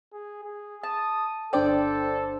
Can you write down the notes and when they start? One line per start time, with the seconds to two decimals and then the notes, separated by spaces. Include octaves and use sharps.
0.13 G#4
0.44 G#4
0.83 A5 D#6
1.53 G1 D4 A4 C5 D5 G5